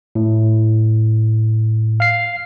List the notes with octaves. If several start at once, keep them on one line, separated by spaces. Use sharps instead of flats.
A2
F5 C7